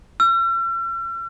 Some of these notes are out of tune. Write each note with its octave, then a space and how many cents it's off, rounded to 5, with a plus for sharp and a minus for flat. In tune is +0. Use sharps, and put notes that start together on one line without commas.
E6 +45